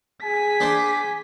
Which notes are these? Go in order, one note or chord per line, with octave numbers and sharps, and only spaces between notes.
G#4 G#5 B6
D4 C5 D5